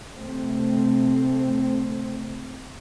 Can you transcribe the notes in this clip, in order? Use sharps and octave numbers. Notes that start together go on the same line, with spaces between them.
C3 A3 C4